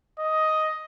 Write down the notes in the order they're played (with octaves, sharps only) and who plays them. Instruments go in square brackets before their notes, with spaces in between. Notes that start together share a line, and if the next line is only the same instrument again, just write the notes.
[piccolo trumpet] D#5